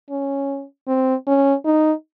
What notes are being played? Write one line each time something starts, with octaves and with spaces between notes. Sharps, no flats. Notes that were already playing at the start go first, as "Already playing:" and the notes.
C#4
C4
C#4
D#4